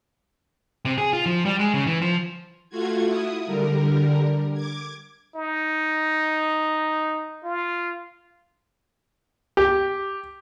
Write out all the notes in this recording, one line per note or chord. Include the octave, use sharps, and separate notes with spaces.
C3
G#4
F4
F3
G3
G#3
C#3
E3
F3
A3 F4 F#4 G#6
E4 D#6
D3 G3 A#4
D6 G#6
D#4
F4
G4